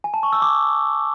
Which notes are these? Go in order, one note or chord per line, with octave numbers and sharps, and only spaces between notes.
G#5
A5
C#6
E6
D6